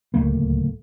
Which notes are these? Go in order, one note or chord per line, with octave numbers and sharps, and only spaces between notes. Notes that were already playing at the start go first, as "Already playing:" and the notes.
D1 C#2 A3 A#3